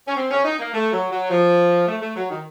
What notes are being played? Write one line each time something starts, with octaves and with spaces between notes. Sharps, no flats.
C#4
C4
C#4
D#4
A#3
A3
F#3
F#3
F3
A3
A3
F#3
D#3